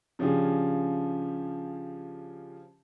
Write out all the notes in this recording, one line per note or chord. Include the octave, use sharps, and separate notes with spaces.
C#3 F3 C#4 D4 G4 G#4